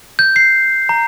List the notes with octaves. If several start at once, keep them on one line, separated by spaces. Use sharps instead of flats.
G6
C7
A#5